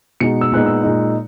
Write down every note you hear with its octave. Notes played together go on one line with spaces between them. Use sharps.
B2 G#3 D#4 C#7
E6
A#2 G#3 B3 D#4 F#6
E6
A#2 G#3 D#4